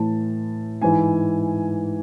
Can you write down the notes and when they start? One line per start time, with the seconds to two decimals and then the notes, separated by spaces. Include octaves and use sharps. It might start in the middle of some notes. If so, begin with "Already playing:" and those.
Already playing: A2 E3 A5
0.82 G#2 E3 G#5